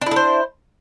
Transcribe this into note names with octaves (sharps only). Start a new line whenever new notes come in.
D4 E4 A4 C5